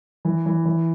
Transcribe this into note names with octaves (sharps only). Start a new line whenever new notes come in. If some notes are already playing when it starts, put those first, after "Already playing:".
E3
E3
E3